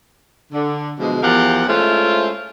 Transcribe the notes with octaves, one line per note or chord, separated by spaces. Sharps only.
D3
B2 D3 E3 F3 G#3
E2 F3 G4 A#4 F5 F#5
G#3 A3 C#4 E4 F4 C5